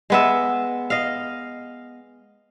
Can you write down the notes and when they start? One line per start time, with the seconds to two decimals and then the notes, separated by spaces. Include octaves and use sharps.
0.10 G#3 B3 E5
0.90 D#5 F5